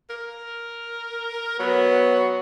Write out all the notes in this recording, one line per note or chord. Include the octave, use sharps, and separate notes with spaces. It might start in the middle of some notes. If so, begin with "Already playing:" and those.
A#4
F#3 B3